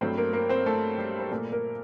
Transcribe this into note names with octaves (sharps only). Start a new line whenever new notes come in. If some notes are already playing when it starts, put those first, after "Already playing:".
G2 F#3 A3 C4 C5
A#3 A#4
A#3 A#4
C4 C5
A3 A4
G3 G4
C5
A#2 A3 A#3 A#4
A#3 A#4